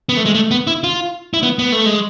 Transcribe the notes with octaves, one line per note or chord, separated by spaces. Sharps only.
B3
A3
G#3
A3
B3
E4
F4
E4
B3
B3
A3
G#3